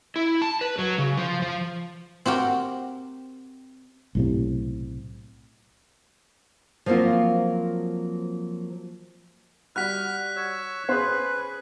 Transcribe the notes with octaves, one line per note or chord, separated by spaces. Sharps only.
E4
A5
B4
F#3
C#3
F3
F3
C4 F#4 G4 A#4
B1 A2 C3
F3 F#3 A#3 C4 F4
G3 F#4 F6 F#6 B6
C#5 E6
C#4 G#4 B4 C5